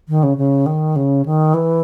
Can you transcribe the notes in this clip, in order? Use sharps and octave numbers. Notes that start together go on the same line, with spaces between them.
D#3
C#3
C#3
D#3
C#3
D#3
E3